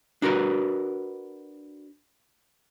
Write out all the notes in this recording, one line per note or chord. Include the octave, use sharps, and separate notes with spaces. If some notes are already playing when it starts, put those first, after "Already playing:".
D4 F#4 A#4 B4